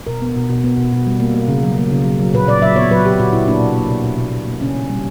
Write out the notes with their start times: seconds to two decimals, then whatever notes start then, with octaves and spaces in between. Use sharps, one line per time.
0.07 B2 A#4
0.22 B3
0.36 B2
0.50 B2
0.64 B3
0.77 B2
0.92 B2
1.07 G3
1.20 A#3
1.34 A#3
1.48 C#3
1.63 F#3
1.78 A#3
1.91 C#3
2.05 F#3
2.20 F#3
2.33 A#2 B4
2.48 A#2 D5
2.62 F#3 E5
2.76 B3 C#5
2.91 F#3 B4
3.05 F#3 G4
3.20 A#2 F#4
3.33 A#2 E4
3.47 A#3 D4
3.61 B2
3.76 A#3
3.91 B2
4.04 B2
4.18 B2
4.33 B2
4.47 A#3
4.61 C#3 C#4
4.75 B3
4.90 G3